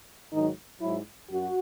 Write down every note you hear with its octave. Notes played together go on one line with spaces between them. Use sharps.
G#2 D#3 F#3 D#4
G#2 F#3 E4
F#2 F#4